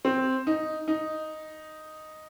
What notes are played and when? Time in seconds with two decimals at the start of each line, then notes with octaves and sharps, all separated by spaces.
0.05 C4
0.47 D#4
0.88 D#4